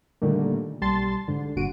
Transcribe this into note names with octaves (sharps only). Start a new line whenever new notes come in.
A#2 D3 D#3 G3 A3 A#3
B1 G3 A5 C6 A6
G#2 D3
G1 A#2 D3 F#4 D7 D#7